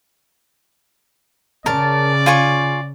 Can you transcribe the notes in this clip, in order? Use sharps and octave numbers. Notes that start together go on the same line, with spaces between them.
C#3 A#4 D5 A5
F4 G#5 C#6